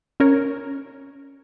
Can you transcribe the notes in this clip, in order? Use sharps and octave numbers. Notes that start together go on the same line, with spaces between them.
C#4 A#4 C#5